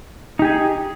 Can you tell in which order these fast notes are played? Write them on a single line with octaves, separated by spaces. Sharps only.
D#4 G4 G#5 G#4